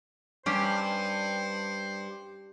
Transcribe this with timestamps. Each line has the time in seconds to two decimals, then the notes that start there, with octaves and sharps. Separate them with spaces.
0.46 G2 C#4 G4 C5